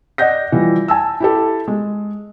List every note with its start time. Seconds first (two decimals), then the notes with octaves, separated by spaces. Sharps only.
0.18 D5 D#5 F#5 G6 A#6
0.52 E3 F3 G3
0.88 G#5 A5 E6
1.20 E4 G4 A4
1.68 G#3